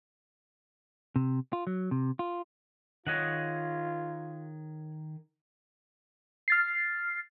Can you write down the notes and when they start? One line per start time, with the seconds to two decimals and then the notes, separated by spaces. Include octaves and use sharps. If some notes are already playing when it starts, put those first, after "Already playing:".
1.16 C3
1.53 F4
1.67 F#3
1.91 C3
2.19 F4
3.07 D#3 F4 G#4 C#5 D#5 F#5 D#6
6.48 F6 A6 C7